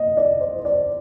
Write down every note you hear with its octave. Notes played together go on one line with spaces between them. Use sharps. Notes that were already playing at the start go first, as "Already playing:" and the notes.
Already playing: A#3 D#5
D5
C5
C5
D5